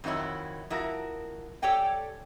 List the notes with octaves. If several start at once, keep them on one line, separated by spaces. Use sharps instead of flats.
F2 D#3 F#3 E4 C#5
F3 E4 F#4 A#4
G4 A4 C#5 D5 G5 G#5